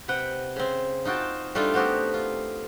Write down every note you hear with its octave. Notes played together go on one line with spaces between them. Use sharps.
C3 B4 F#5 G5
C#3 C4
D#4 F4 F#4 G5 A5
G3 A3 D4 D#4 F4
B3 C4 F#4 G4 A4
F4